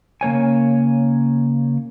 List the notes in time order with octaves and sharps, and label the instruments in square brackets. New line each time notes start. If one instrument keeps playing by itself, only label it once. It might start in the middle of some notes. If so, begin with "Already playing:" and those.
[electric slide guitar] C#3 A#3 C#5 G#5